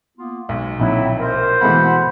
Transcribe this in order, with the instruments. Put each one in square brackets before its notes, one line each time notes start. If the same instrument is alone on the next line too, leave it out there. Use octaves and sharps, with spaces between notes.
[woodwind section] A#3 B3 F4
[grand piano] B1 [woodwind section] G#3
[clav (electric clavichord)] A#1 D#4 F#5 [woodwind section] D3 F#3 C4 [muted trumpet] E4
[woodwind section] A#4 [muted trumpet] C5
[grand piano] B2 E3 [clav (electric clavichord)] G#3 A3 F5 [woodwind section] F#5 B5